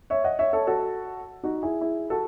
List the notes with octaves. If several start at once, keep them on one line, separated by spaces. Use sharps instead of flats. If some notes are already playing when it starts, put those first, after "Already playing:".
C#5 E5
D#5 F#5
C#5 E5
A4 C#5
F#4 A4
D#4 F#4
E4 G#4
E4 G#4
F#4 A4